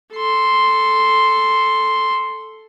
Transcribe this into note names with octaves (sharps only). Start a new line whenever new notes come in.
A4 C6